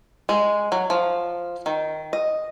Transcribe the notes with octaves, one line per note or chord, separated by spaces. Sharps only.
G#3
F#3
F3
D#3
D#5